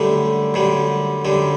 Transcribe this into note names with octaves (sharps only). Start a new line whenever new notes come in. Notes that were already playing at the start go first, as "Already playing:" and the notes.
Already playing: F#2 D3 G3 A3
F#2 D3 G3
F#2 D3 G3